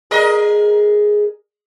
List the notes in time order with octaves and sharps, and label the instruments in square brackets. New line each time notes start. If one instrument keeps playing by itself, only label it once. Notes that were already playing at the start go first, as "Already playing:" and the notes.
[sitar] G#4 A#4 D#5